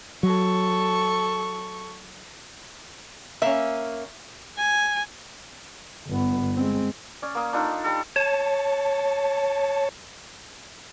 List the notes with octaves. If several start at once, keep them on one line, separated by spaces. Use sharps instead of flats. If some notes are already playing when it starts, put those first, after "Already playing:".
F#3 A4 C#6
A#3 C#4 E5
G#5
G1 B3
G#3 C4
C#4 D5
A#3 D#6
D4 D#4 F4 A4
G3 A4
C#5 A5